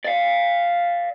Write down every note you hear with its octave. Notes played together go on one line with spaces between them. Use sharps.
D5 F5